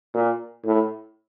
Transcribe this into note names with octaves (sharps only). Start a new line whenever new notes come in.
A#2
A2